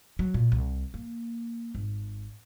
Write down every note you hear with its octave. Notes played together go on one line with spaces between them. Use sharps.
F#3
A#2
C2
A#3
G#1